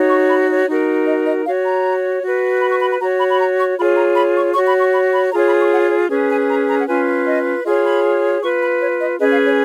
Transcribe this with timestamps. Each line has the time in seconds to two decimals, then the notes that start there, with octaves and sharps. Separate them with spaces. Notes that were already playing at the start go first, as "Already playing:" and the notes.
Already playing: D#4 F#4 C#5
0.09 C#6
0.29 B5
0.49 C#5
0.67 D#4 F#4 A#4
1.06 D#5
1.25 D#5
1.45 F#4 C#5 F5
1.64 A#5
2.22 F#4 B4
2.61 B5
2.71 C#6
2.80 B5
2.90 B5
3.00 F#4 A#5
3.04 C#5
3.19 B5
3.30 B5
3.39 A#5
3.58 C#6
3.77 F4 G#4 C#5 B5
3.96 A#5
4.16 B5
4.35 C#6
4.54 F#4 C#5 C#6
4.67 B5
4.80 C#6
4.93 B5
5.13 B5
5.32 F4 G#4 C#5 A#5
5.45 B5
5.58 C#6
5.71 F#5
5.90 C#5
6.10 C#4 G#4 B4
6.29 G#5
6.48 A#5
6.68 A#5
6.78 F#5
6.87 C#4 F4 B4 G#5
7.26 D#5
7.64 F4 G#4 C#5 D#5
7.84 B5
8.42 F4 B4 C#6
8.61 B5
8.81 C#5
9.00 D#5
9.19 C#4 G#4 B4 D#5
9.32 F5
9.44 C#5